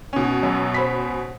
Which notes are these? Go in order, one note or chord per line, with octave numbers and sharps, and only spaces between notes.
B2 C#4
F#2
C5 B5 B6